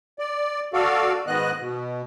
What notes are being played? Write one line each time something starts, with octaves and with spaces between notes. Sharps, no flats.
D5
F#4 A4 D5 F5
G#2 D#3 B3 D#5 F#6
B2